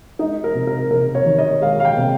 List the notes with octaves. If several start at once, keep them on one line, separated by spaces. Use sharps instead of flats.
G#3 D#4
A#4
C3
A#4
C3 A#4
C#5
D#3
D#5
G#3 F5
F5
G5
C3